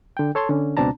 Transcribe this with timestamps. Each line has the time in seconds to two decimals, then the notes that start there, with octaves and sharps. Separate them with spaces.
0.17 D3 G5
0.35 A4 C#5 A5 C6
0.49 D3 C#4
0.77 C#2 B2 C4 D4 A5 A#5